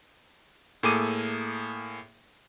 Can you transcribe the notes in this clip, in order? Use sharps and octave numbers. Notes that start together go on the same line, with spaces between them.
A2 A#3 G#4 A4 D6 D#7